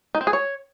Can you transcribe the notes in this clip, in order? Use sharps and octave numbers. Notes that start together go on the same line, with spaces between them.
D#4
C4
G#4
C#5